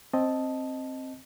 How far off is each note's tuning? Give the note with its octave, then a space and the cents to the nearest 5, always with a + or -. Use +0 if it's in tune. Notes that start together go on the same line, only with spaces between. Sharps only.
C4 +10 D#5 +0 A5 -5